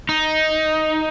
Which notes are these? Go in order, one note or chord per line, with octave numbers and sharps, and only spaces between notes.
D#4